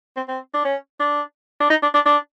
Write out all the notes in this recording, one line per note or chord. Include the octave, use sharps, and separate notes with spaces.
C4
C4
D4
C#4
D4
D4
D#4
D4
D4
D4